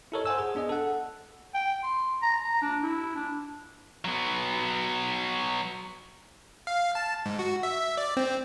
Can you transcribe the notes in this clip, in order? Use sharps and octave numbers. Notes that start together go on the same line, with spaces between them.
E4 G4 A4 A#4 C#5 D#5
C5 F#5 G#5 E6
G#4
B3 D4 G#4 D#5
A4 F#5
G5
C6
A#5
A#5
D4
E4
D4
F#3 B3
F5
A5
G#2
F#4
E5
E5
D5
C4